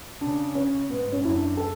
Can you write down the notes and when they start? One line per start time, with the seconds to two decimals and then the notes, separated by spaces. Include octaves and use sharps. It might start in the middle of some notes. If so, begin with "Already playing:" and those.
0.21 C#3 D4
0.55 C#4
0.89 G#2 B3
1.12 C#4
1.23 F#2 E4
1.34 D4
1.57 A4